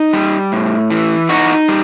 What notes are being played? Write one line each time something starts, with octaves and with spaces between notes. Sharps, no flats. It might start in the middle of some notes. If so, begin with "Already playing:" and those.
Already playing: D#4
G3
A2
E3
D#4 F#4
G3